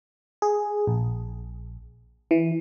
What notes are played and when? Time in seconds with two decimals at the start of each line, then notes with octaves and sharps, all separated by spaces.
0.42 G#4
0.87 A#1
2.31 E3